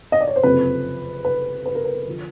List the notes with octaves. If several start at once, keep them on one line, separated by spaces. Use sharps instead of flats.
D#5
D5
C#5
C5
F#1 F2 C3 B4
B4
B4
A#4
B4
D3 F3